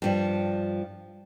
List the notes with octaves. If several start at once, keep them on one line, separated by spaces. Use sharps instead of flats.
G2 F3 G3